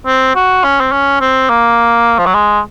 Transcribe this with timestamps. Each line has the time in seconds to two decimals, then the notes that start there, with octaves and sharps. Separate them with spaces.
0.06 C4
0.36 F#4
0.64 C#4
0.81 C4
0.92 C#4
1.21 C4
1.50 A#3
2.19 F3
2.26 F#3
2.35 G#3